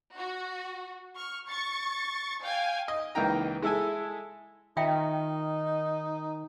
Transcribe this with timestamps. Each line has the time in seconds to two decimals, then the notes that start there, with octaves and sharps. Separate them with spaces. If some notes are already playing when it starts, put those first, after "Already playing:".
0.15 F#4
1.13 C#6 F6
1.47 C#6 A6 C#7
2.42 F5 G5 G#5
2.88 D#5
3.15 C#2 E3 A#3 D#4 G5 A#5
3.62 G#3 E4 A4 E5 G#5
4.77 D#3 D#4 F4 E5 G5